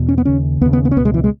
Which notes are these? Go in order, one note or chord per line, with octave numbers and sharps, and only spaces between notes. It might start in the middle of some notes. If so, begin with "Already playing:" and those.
Already playing: E2 B2
C#4
B3
D#2 C#3 C#4
D#2 C#3 B3
B3
B3
C#4
C#2 B2 B3
G#3
E3
G#3